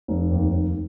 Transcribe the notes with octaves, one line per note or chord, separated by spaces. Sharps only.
F1
D#2
D#2